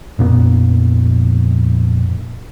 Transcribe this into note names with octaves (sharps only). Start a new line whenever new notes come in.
A#1 F2 A#2 B3